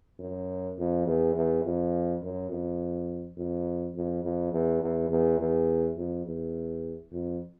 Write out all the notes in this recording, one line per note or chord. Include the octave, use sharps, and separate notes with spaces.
F#2
F2
E2
E2
F2
F#2
F2
F2
F2
F2
E2
E2
E2
E2
F2
E2
F2